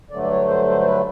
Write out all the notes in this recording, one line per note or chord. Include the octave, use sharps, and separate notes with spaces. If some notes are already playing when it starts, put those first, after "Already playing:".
G2 D3 F#3 A3 D5
D5
C#5
C5
C5
C5
B4